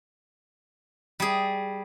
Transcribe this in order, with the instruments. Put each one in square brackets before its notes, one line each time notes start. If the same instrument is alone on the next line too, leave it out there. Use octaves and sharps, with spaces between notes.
[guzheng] G3 G#4